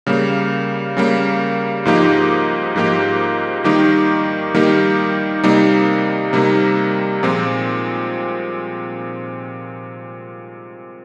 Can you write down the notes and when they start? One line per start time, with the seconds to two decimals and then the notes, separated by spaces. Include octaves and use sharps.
0.06 C#3 G3 A#3
0.97 C#3 G3 A#3
1.85 G#2 F3 A#3 D#4 G4
2.76 G#2 F3 A#3 D#4 G4
3.64 D#3 G3 A#3 D#4 G4
4.54 D#3 G3 A#3 D#4 G4
5.44 C3 G3 A#3 D#4
6.33 C3 G3 A#3 D#4
7.23 A#2 F3 G#3 C4